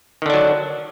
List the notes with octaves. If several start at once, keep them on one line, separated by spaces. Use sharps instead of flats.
D3 D#3 F#3 D4